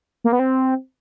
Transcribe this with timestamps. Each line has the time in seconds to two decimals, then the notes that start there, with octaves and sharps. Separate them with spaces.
0.24 A#3
0.33 B3
0.39 C4